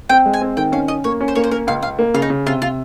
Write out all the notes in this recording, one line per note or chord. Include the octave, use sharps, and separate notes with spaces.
C4 G5
G#3
G#5
C4
D#3 G5
C#4 F5
C#4 D#5
A#3 C#5
C#4
C5
A#3 C#5
C5
A#3 A#4
C#2 F5
C#2 F5
A#3
C#3 F4
D#4
C#3
C3 F4
C3 F4